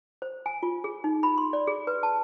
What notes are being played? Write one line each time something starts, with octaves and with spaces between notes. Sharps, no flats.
C5
G#5
F4
G#4
D#4
B5
C6
D5
G#4
B4
A5